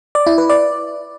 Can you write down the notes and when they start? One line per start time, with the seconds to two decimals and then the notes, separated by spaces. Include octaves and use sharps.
0.15 D5
0.27 E4
0.38 B4
0.50 D5